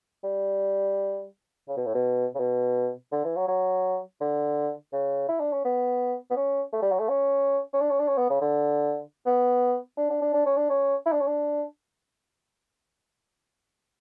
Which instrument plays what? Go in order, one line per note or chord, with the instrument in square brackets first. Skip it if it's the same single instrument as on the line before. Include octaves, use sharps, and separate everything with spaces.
[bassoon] G3
C#3
B2
A2
B2
C#3
B2
D3
E3
F#3
F#3
D3
C#3
E4
D4
C#4
B3
B3
C#4
A3
G3
F#3
A3
C#4
C#4
D4
C#4
D4
C#4
B3
C#3
D3
B3
D4
D4
D4
D4
C#4
D4
C#4
E4
D4
C#4
D4